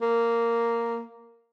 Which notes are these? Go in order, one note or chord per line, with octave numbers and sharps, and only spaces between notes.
A#3